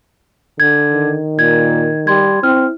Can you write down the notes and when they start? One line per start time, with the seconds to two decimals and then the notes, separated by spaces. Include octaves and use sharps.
0.60 D3 G#6
0.93 D#3
1.39 A#2 G#6
2.07 G3 C6 G#6
2.43 C4 E4 F6